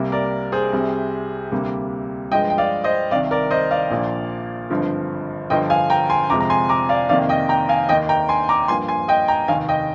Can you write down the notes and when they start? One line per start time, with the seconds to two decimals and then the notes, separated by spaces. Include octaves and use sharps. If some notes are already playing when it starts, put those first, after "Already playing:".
Already playing: C2 C3 G3 A#3
0.12 A#4 D5
0.52 G#4 C5
0.72 C2 C3 G3
1.52 D2 C3 G3 A#3
2.31 G2 F3 G#3 D#5 G5
2.50 G5
2.58 D5 F5
2.84 C5 D#5
3.11 C2 C3 D#3 D5 F5
3.31 A#4 D5
3.51 C5 D#5
3.71 D5 F5
3.90 A#1 A#2 F3 A#3
4.70 G#1 G2 D3 F3
5.50 G1 G2 D3 F3 D#5 G5
5.70 F5 G#5
5.90 G5 A#5
6.10 G#5 C6
6.30 F2 C3 F3 G#3 A#5 D6
6.40 A#5
6.50 G#5 C6
6.69 A#5 D6
6.89 D5 F5
7.09 F2 C3 D#3 A#3 D5 F5
7.29 D#5 G5
7.49 G5 A#5
7.69 F5 G#5
7.89 D#2 D#3 A#3 D#5 G5
8.09 G5 A#5
8.29 G#5 C6
8.49 A#5 D6
8.68 G2 F3 A#3 G#5 C6
8.88 G#5 C6
9.08 D#5 G5
9.28 G5 A#5
9.48 F1 D#2 D#3 F5 G#5
9.69 D#5 G5